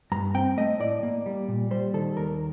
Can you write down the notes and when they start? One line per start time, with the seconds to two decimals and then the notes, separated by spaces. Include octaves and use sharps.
0.12 G2 A#5
0.35 C4 G5
0.57 A3 D#5
0.80 A2 D5
1.03 A#3
1.26 G3
1.48 A#2
1.71 G3 C5
1.94 D#3 A4
2.17 D#2 A#4